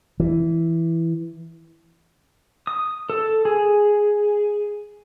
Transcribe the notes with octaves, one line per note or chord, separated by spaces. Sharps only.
E3
D#6
A4
G#4